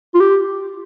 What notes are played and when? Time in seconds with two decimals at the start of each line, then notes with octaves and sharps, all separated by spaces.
0.15 F4
0.21 G4